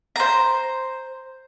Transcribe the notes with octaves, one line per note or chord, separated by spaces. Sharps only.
C5 A#5